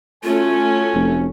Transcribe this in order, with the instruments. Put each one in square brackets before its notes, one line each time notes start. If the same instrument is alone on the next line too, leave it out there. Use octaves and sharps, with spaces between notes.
[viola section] A3 C#4 F#4 [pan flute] F4 [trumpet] G#5
[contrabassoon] F1